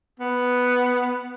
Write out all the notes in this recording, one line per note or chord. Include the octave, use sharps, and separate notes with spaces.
B3